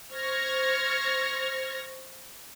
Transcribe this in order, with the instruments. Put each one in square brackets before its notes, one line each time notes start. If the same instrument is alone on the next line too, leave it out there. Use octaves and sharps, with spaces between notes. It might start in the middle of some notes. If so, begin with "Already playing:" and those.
[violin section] C5 C#6 F6 G#6 A#6